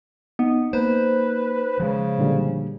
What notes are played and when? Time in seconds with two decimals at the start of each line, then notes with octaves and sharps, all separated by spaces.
0.39 B3 D#4
0.73 A#3 B4 C5
1.80 C#3 F3 G#3
2.18 A#2 D3 G3